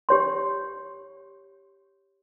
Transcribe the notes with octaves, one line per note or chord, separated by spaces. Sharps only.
G4 C#5 C6